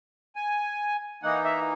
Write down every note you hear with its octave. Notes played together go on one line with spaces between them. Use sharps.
G#5
E3 A#3 D#4 F#5
E5